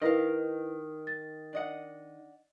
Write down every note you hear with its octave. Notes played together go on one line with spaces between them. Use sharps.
D#3 E4 A#4 B4 D#5 F5
A6
D4 D#5 F#5